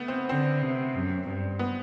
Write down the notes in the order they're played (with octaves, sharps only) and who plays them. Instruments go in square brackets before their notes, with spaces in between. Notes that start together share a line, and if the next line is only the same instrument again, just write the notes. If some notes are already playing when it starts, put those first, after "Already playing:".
Already playing: [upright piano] A3 B3
C4
[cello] D3 [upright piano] C4
[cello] C3
F#2
G2
[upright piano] B3